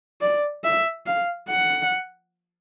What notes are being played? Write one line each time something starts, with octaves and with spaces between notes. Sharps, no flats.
D5
E5
F5
F#5